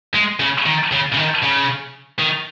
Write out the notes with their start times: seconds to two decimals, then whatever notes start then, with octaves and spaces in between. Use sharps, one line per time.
0.14 G#3
0.40 C#3
0.66 D#3
0.92 C#3
1.12 C#3
1.17 D#3
1.42 C#3
2.19 D#3